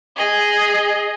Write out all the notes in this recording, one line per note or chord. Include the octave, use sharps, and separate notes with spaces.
G#4 D#5